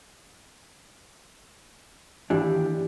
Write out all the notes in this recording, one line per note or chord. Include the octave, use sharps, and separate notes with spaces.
D#2 E3 D4 G4